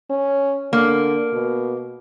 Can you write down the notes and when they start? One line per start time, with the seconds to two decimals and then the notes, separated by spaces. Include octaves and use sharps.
0.10 C#4
0.73 D3 A#3
1.33 B2